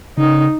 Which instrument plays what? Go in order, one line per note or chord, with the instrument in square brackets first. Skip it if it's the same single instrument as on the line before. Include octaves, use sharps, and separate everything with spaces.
[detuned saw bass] C#3 [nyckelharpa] D#4